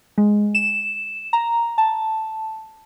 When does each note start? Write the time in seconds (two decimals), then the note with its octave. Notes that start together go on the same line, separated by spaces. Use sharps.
0.18 G#3
0.55 E7
1.33 A#5
1.78 A5